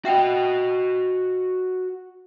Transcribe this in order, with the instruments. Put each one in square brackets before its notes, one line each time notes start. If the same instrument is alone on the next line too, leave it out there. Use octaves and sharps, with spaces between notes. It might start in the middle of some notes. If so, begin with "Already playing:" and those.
[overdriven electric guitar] F#4 D#5 [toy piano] E5 F#5 G5